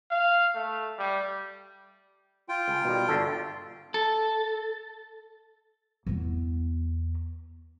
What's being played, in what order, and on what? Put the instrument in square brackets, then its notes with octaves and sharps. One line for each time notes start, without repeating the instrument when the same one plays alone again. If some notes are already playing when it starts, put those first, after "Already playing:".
[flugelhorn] F5
A3
G3
[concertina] F4 G5
[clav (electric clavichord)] C#2
B2 D#3 G3
G1 D3 A4
[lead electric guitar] A4
[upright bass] E2 B3